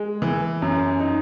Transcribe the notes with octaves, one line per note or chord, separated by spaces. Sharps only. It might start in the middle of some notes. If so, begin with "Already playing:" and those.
Already playing: G#3
E3
F#2
D#4